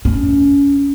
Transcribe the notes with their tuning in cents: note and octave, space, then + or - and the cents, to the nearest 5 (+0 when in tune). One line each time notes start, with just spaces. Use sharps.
C#4 +25